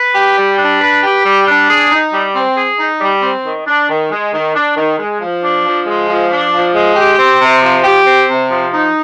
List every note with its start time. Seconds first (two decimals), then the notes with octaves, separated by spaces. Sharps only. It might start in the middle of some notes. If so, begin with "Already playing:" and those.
Already playing: B4
0.15 G4
0.37 G3
0.59 D4
0.81 B4
1.03 G4
1.25 G3
1.47 D4
1.69 G#4
1.92 D#4
2.12 G3
2.35 C4
2.56 G#4
2.79 D#4
3.00 G3
3.22 C4
3.45 D#3
3.66 D4
3.89 D#3
4.11 G#3
4.33 D#3
4.55 D4
4.77 D#3
4.98 G#3
5.20 F3
5.42 D4
5.65 F3
5.86 G#3
6.08 F3
6.30 D4
6.52 F3
6.74 G#3
6.96 G4
7.18 C4
7.39 C3
7.62 F3
7.84 G4
8.06 C4
8.28 C3
8.50 F3
8.72 D#4